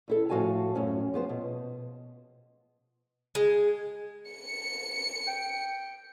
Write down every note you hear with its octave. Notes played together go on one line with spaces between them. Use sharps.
E2 E4 A4
A2 F3 F#4 F5 G#5 A5
F#2 A2 C#4
F3 B3 C5
B2
G#3
C#7
G5